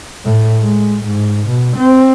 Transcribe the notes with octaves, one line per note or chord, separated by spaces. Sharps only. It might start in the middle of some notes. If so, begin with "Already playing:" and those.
A2
G#3
G#2
B2
C4